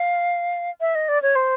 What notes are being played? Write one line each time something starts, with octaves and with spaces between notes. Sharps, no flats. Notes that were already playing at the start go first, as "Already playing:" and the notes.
Already playing: F5
E5
D#5
D5
C#5
C5